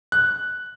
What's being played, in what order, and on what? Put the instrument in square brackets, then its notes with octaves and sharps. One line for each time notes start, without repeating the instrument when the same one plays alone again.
[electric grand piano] F#6